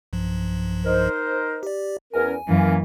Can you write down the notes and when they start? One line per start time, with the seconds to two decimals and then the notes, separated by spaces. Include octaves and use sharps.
0.13 B1 G2 F3
0.85 D#4 A#4 C5
1.63 G4 D5
2.14 E2 C#4 A#4 G#5
2.48 F#2 E3 A#3 C#4